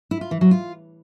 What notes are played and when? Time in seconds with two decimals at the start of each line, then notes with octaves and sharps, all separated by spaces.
0.11 E4
0.21 F4
0.31 E3
0.41 F#3
0.51 F4